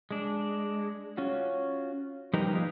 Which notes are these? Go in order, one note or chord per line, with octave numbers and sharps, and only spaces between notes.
G#3 D4
C#4 F4 F#4
F3 G3 D#4 G4 A#4 B4
A#3 F4 G4 G#4